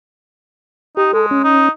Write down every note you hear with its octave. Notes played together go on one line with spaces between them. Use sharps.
D#4 G4
G#3 A4
C#4
D#4